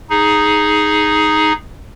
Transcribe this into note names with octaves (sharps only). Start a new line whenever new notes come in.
D#4 G#4